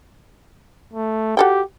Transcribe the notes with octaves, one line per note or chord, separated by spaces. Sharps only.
A3
F#4 G4 A4 G5